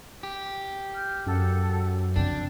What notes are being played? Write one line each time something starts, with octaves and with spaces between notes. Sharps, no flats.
G4
F6 G6
F#2 A4 F#5
F2 C3 D4 G5